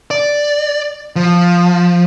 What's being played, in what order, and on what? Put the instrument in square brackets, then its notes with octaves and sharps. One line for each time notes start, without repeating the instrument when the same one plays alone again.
[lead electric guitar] D5
F3